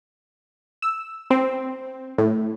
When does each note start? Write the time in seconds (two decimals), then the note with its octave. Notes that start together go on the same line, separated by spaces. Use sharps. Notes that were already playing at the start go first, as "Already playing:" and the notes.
0.82 E6
1.30 C4
2.18 A2